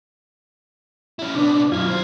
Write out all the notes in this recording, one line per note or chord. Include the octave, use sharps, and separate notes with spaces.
C#4 E4
C3 B3 D4
F#2 B2 F4 G#6
F#2 C5